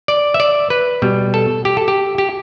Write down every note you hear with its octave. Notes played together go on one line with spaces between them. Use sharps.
D5
E5
D5
B4
B2 G3
A4
G4
A4
G4
G4